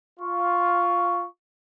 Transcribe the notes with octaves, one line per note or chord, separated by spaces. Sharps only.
F4 C#6